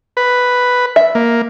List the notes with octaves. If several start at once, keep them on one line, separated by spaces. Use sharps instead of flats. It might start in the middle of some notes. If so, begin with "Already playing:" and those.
B4
E5
A#3